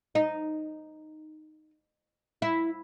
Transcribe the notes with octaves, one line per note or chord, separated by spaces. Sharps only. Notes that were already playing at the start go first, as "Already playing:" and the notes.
D#4
E4